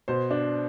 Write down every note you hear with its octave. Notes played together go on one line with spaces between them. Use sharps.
B2 C5
D4